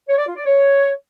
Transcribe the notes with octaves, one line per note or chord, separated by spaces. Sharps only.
C#5
D5
F4
D5
C#5